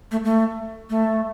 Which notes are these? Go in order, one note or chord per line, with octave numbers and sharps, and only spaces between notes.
A3
A3
A3